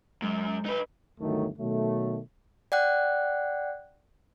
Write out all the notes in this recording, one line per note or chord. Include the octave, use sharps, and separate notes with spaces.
F#2 G#3
D#4 B4
G1 D2 D#3 F#3 A3
B2 D#3 F#3 A3
D5 F#5 G5 F#6